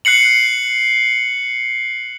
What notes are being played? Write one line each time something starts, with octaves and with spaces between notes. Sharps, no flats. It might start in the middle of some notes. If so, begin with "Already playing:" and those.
F#6 C7 C#7 F#7